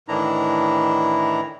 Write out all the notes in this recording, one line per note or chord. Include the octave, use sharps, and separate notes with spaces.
A2 D#3 E3 D4 E4 A#5